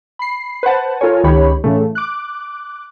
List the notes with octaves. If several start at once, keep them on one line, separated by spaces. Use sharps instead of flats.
B5 C7
B4 C5 F#5 A5
F4 A4 A#4 C#5 G#5
C#2 D#3 G4 C#5 B5
A2 C#3 E3 A3
D6 F#6